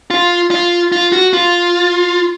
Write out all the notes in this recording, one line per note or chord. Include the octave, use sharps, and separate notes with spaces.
F4
F4
F4
F#4
F4